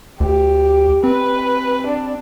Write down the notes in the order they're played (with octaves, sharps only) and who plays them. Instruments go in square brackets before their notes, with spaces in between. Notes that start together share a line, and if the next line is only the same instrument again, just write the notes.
[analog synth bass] D2 [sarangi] G4
[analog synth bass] C4 [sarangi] B4
[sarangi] D4